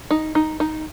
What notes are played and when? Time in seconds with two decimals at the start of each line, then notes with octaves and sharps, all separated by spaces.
0.11 D#4
0.35 D#4
0.60 D#4